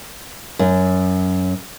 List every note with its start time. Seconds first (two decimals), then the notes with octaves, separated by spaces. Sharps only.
0.59 F#2